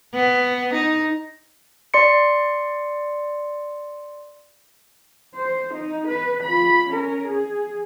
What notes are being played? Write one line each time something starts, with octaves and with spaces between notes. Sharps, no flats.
B3
D#4
D5 C6 C#7
C5
D#4
B4
F4 B5
C#4 A#4
G#4